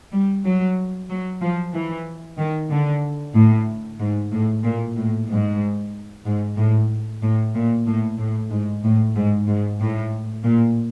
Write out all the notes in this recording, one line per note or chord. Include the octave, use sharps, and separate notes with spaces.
G3
F#3
F#3
F3
E3
D#3
D3
A2
G#2
A2
A#2
A2
G#2
G#2
A2
A2
A#2
A2
A2
G#2
A2
G#2
G#2
A2
A#2